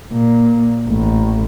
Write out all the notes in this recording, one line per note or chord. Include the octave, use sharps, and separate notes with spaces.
A#2
A1